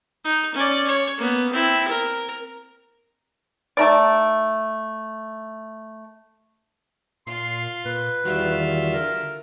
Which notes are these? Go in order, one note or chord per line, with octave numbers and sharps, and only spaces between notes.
D#4
C#4 D5
C#5
A#3 B3
C4 E4
A#4
A3 D#4 D5
A#2 F4 C6
A#2 B4
E2 D#3 G3 F4 F#4 E5
D3 A#4